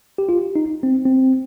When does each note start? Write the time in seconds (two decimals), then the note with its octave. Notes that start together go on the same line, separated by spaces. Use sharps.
0.18 G4
0.29 F4
0.56 D#4
0.83 C4
1.06 C4